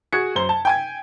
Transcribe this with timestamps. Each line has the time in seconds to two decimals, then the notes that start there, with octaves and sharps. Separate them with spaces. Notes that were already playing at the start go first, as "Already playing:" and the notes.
0.13 F#4 G#4 G#6 C#7
0.35 F#2 C5 G7
0.49 A5
0.65 G5 G#5 G#6